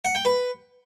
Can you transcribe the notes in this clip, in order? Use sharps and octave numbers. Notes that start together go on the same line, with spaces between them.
F#5
G5
B4